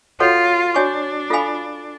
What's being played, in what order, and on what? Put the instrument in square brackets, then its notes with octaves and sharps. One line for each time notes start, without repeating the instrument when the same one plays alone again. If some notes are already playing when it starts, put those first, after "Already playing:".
[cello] F4 [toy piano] F#4 A4 C#5 F#5
[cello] D4 [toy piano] F#4 C#5 G#5 C#6
[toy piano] F4 A4 F5 G#5 B5